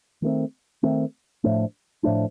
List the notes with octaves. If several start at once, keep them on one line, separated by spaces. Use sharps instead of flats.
D#3 A3 C4
D#3 A3 C4
A2 F3 A3 D4
A2 F3 A3 D4